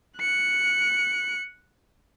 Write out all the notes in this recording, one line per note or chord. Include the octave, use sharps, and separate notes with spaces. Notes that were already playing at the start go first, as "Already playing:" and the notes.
F#6 C#7